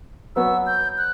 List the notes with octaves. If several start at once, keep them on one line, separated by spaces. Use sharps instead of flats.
F#3 B3 F#4 E6
G6
F#6